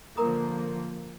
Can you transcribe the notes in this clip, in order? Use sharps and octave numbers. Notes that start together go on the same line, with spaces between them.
D3 F3 A#3 A#4 A#5 D#6